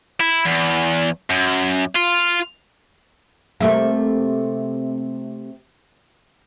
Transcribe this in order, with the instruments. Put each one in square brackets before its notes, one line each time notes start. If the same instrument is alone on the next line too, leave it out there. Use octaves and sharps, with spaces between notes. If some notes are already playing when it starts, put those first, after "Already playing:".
[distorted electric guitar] E4
E2
F#2
F4
[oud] C3 A3 A#3